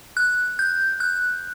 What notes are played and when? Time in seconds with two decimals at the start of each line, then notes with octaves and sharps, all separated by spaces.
0.17 F#6
0.59 G6
1.00 F#6